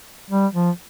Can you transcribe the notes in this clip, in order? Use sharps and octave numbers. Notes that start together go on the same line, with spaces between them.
G3
F3